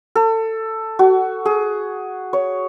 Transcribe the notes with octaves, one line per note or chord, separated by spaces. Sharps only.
A4
F#4
G#4
C#5